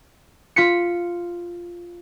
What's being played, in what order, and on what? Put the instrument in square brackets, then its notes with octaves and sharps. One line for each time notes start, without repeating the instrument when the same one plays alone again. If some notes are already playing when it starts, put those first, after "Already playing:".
[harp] F4 B6 C#7